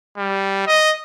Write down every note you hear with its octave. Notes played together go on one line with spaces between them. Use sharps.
G3
D#5